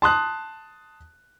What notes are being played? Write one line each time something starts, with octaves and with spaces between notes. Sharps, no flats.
A5 C6 D#6 F#6